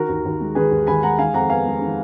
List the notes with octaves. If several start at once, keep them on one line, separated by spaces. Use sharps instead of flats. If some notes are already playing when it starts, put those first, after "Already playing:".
Already playing: D#3 F#4 A#4
D#2
D#2
G#3
D#3 G#4 B4
D#2
D#2 G#5 B5
G#3 F#5 A#5
D#3 F5 G#5
F2 F#5 A#5
B3 F5 G#5
G#3
D#3